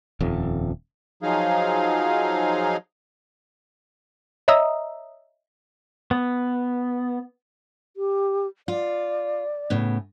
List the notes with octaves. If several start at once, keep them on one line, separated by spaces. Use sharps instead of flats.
D#1 F2
F3 F#3 D#4 G#4 F5
C#5 D#5 E5 A#5 D#6 E6
B3
G4
F4 D5
A2 C#3 B3